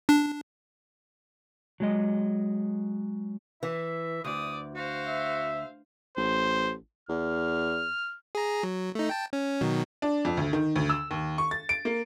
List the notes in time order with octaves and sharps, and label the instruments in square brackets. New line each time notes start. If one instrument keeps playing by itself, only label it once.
[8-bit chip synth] D4
[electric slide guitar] F#3 G#3 D#5
[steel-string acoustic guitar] E3 [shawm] E5
[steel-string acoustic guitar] D2 [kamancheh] D5 [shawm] D#6
[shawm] F#4 [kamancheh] C5 F5
[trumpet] E5
[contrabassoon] A1 [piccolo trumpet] C5
[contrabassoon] E2 [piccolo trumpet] F6
[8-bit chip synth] G#4 A#5
F#3
A3 D#4
G5 A5
C#4
B2 D#3 F#3
[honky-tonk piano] D4
F2
D2
D#3
D2
E6
D#2
C#6
A6
D7
A#3